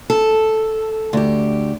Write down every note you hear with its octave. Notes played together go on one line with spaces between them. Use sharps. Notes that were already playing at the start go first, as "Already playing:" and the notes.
A4
D2 G4